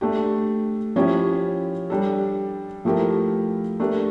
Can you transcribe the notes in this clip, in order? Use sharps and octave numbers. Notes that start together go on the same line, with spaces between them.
A3 D4 G4
F3 C#4 E4 G4
G3 D4 A4
F3 A3 E4 G4 A#4
A3 D4 G4 A#4